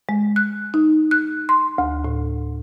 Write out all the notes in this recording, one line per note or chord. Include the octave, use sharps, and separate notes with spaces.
G#3
F#6
D#4
F#6
C6
D2
A2